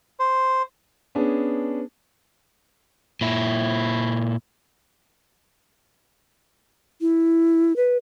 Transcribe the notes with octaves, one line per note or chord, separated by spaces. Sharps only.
C5
B3 C#4 D4 G#4
A#2 E4
E4
B4